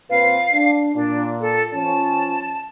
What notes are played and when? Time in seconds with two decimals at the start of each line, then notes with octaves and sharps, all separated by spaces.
0.10 A#2 C4 B4 F5
0.52 D4
0.95 A#2 D4
1.41 A4
1.73 F3 C#4 A5